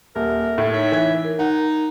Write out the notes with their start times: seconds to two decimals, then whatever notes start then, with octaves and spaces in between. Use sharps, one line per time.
0.16 D#1 A#4 E5
0.58 A2
0.73 D#4 C#5 E5
0.92 E3 G#6
1.24 A#4
1.39 D#4 F#5